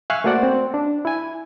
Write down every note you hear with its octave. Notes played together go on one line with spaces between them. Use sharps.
E5 F5 G#5 C#6 F#6
A3 A#3 F#4 C5 D5 F#5
C4
D4
E4 G#5